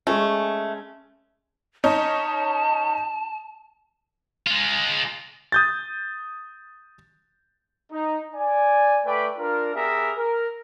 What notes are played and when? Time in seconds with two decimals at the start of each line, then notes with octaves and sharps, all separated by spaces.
0.07 G#3 A3 C#4
1.84 C#4 D#4 A5
4.47 G#3 F4
5.52 D#6 G6 A6
7.92 D#4
8.35 D5 G#5
9.06 A3 B4 D5 G5 B5
9.39 D4 F4 A#4
9.75 B3 G4 G#4 A#4 E5
10.17 A#4